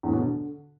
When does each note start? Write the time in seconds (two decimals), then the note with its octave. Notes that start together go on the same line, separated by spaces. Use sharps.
0.03 E2
0.08 A2
0.13 B2
0.18 D3